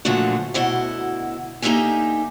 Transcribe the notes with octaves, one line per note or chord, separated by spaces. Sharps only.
A#2 D3 F3 F#3 A3 F#4
D2 B2 E4 D#5 F#5
D3 A#3 D#4 G4 E5 G#5